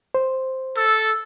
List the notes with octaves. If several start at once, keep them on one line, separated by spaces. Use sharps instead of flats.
C5
A4 E6